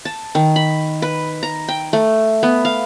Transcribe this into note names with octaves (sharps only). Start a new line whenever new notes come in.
A5
D#3
B5
B4
A#5
G5
A3
B3
F5